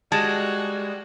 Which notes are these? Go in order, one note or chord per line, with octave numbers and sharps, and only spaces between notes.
G3 G#3 F#4 A5